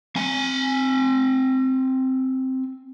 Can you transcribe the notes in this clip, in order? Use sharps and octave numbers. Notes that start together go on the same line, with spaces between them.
C4 G#5